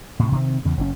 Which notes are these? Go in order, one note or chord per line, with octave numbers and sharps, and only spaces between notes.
A2 C3
C3 D#3 C4
E2 C#3
F#1 A2 C#4